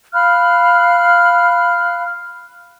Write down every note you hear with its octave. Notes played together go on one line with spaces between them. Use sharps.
F5 B5 F6 F#6